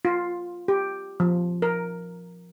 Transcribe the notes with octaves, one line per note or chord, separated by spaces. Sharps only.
F4
G4
F3
A#4